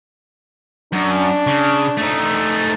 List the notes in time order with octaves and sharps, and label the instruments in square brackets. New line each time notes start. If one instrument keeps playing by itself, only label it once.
[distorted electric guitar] F#2 [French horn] D4
[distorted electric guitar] C#3
A3 D#4